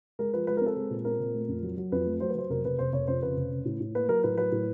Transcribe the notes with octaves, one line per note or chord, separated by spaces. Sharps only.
G#3 A#4
F3 B4
G#3 B4
A#4
C4 A4
G#3
A#2
C4 A#4
A#2
A3
F2
F#3
F#3
F2 B4
A3
F#3 C5
B4
F#3 C5
F1 A#4
F1 B4
F1 C5
F1 C#5
F2 C5
C#3 B4
F1
C#3
A2
A2
A#3 B4
F#3 A#4
A2 B4
F#3 B4
A2